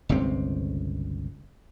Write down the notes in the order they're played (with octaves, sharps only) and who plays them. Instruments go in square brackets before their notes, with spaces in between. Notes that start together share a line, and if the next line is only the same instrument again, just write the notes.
[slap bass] G1 C#2 C3 C4